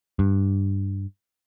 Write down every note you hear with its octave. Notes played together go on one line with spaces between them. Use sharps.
G2